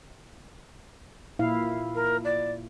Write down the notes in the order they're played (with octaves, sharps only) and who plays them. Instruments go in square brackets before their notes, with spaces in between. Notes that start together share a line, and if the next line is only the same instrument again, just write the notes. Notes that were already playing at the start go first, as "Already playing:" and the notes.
[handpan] A#2 E4 F5
[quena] A#4
D5